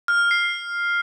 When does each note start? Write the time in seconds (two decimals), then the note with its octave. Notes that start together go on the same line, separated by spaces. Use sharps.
0.08 F6
0.31 C7